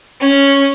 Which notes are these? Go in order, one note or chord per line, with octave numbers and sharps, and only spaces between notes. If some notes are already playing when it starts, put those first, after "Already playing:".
C#4